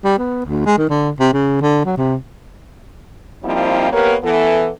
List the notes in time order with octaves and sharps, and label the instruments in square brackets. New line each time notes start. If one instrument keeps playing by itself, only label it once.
[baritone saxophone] G3
B3
D2
G#3
D#3
D3
C3
C#3
D3
F#3
C3
[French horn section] F3 G3 A#3 C4 D#4 E4
A#3 B3 G4 A#4 B4 C#5
E3 B3 A4